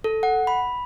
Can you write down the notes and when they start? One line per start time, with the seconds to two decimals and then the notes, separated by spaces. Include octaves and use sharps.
0.04 A4
0.23 F#5
0.47 B5